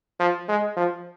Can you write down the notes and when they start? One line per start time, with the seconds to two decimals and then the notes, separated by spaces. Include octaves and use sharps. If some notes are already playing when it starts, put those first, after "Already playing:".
0.20 F3
0.48 G#3
0.77 F3